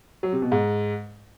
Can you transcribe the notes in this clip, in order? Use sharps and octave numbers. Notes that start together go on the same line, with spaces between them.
F#3
C3
B2
G#2